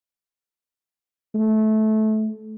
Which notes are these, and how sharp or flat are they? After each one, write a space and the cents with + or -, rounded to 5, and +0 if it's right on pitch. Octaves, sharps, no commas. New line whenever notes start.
A3 -20